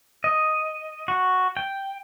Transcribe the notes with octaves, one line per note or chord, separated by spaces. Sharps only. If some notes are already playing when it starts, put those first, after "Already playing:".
D#5
F#4
G5